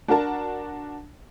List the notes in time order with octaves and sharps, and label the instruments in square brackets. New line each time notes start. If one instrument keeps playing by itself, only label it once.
[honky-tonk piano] D4 F#4 A#4 A5